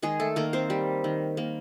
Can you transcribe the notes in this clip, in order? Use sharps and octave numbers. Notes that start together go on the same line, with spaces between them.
D#3 G#3 G#4
A3 A4
D#3 A#3 A#4
C4 C5
G3
D#3
A#3